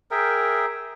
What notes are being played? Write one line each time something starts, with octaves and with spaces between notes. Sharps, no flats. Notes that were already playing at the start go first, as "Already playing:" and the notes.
G#4 A#4 E5 G5